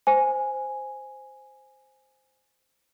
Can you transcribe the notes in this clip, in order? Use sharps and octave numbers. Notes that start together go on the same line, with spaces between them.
C5 G#5